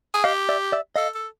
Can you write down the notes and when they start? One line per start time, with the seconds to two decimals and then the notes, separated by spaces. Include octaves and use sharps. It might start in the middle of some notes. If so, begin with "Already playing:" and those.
0.14 G#4
0.24 G4 D#5 F5
0.49 D5 E5
0.72 D5 E5
0.96 A4 D#5 F5
1.14 A4